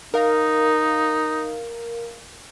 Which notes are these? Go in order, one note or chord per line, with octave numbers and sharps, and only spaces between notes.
D#4 A#4 F5